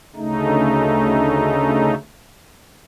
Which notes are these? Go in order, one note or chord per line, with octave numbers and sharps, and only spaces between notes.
D2 C#3 A3 D#4